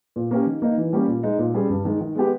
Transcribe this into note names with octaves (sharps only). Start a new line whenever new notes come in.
A#2
A#3 C#4 G4
D#3
A#3 D#4
E3
G3 A#3 C#4 G4
A#2
G#3 D#4
A#2
G3 C#4 G#4
G2
D#3 G#3 D#4
D#3
G#3 B3 G4